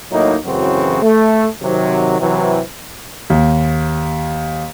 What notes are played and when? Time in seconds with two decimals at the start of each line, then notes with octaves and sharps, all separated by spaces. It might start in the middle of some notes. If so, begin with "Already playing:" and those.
0.12 A2 F#3 A#3 D#4
0.44 A1 F#2 C#3 E3 C4 F#4
1.02 A3
1.63 C3 D#3 F#3
2.20 C3 E3 F#3
3.30 D#2